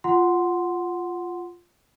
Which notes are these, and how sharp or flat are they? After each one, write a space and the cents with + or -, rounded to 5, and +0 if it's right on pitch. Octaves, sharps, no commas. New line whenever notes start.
F4 +0 F#5 +0 C6 -5